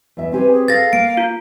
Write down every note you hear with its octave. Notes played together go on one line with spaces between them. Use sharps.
E2 E5
C4 G4 B4 G#5
G#4
G#4 A4 F5 A6 A#6
A#3 D7
F4